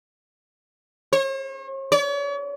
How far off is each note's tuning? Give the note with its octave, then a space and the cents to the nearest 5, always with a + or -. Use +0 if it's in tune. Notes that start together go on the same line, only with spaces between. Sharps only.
C#5 -45
C#5 +45